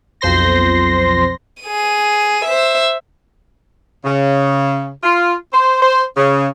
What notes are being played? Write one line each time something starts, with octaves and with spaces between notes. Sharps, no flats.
B1 F2 C5 C6 A#6
G#4 D#7
C5 E5
C#3
F4
C5
C5
C#3